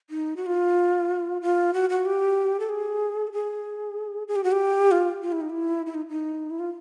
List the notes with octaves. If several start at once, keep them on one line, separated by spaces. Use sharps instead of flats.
D#4
F#4
F4
F4
F#4
F#4
G4
A4
G#4
A4
G#4
G#4
G4
F#4
G4
F4
F4
E4
D#4
E4
E4
D#4
D#4
E4
F4